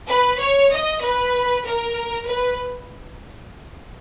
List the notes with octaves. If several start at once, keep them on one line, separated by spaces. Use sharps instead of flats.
B4
C#5
D#5
B4
A#4
B4